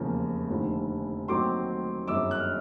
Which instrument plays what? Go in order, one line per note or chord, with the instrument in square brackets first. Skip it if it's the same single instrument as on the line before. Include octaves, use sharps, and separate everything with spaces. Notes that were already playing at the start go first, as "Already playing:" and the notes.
Already playing: [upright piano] F1 E2 C#3 F3 A#3
F1 D#2 D3 F3
D#2 D#3 F#3 A3 C4 C6 D6
G1 F#2 D#3 G#3 C#4 D6 E6
F#6
F6